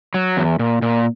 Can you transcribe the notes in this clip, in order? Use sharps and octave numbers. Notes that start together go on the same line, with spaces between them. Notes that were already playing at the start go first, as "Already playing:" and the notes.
F#3
E2
A#2
A#2